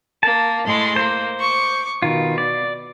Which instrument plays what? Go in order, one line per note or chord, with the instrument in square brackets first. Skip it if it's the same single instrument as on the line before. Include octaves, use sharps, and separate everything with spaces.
[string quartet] A#3 [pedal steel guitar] A5
[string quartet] A2 G#3 C6
[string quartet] A#3 [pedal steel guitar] C5
[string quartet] C#6 D6
[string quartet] B2 [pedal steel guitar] D#3 F4
[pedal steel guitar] D5